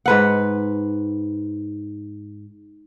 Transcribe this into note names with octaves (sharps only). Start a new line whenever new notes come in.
G#2 B4 F#5